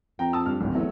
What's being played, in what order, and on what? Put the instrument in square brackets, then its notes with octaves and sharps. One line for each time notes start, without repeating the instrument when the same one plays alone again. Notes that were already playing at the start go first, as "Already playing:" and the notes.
[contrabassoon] F2 [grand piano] G5 A#5
[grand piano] A5 D#6 E6
G2 F6
D1 G#1
[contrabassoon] E2 [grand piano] F#3 A3 F#4